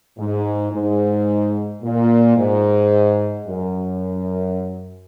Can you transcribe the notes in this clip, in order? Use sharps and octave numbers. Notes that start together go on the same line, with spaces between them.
G#2
G#2
A#2
G#2
F#2